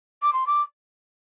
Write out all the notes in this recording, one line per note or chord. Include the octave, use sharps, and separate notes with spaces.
D6
C6
D6